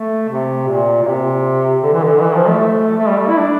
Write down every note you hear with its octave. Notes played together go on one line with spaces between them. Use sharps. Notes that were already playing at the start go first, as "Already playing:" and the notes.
Already playing: A3
C3
A#2
A#2
C3
D3
E3
D3
E3
F3
A3
A3
G3
A3
E4
D4